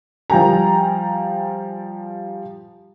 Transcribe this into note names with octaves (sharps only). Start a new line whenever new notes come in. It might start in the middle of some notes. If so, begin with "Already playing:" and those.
F3 G3 G5 G#5 A#5